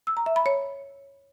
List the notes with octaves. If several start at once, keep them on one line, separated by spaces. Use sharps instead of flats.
E6
A#5
E5
B5
C#5